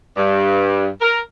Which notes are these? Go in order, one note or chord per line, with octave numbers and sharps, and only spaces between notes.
G2
A#4